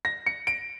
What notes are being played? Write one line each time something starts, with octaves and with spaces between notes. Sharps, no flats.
A#6
C#7
D7